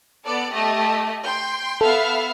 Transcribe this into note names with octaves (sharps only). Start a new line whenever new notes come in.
B3 A4 D5
A3 G4 D#5
G5 C6
B3 A4 E5 F5